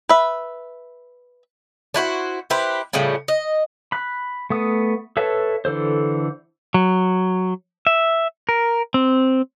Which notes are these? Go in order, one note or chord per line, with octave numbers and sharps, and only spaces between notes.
B4 E5
D4 E4 F#4 C5
E4 G4 B4 C5
A2 C#3 F3 G3
D#5
B5 F#6
A3 B3 D#6
A4 B4 C#5 E5 A5
D3 E3 A4 C5
F#3
E5
A#4
C4